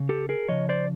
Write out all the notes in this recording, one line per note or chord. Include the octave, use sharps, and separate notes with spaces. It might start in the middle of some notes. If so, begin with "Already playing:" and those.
Already playing: C#3
G4 A4
G#4 A#4
C#3 F3 C#5 D#5
C5 D5